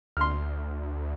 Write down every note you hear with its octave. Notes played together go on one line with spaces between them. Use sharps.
D2 C6 F6